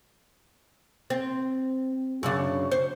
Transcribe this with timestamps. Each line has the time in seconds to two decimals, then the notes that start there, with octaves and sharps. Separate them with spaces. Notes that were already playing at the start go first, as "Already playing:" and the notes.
1.10 C4
2.23 F#2 C#3 D4
2.72 C5